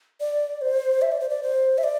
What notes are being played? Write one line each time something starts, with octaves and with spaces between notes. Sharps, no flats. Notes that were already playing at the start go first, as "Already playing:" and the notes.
D5
C5
E5
D5
C5
D5
C5
E5
D5